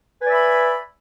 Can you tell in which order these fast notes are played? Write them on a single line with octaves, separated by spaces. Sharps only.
B4 G#5 D5 E5 B5